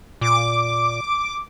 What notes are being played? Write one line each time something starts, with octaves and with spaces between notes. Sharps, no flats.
A#2 D6